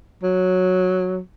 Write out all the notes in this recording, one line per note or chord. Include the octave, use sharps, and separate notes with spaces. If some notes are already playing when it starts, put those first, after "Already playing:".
F#3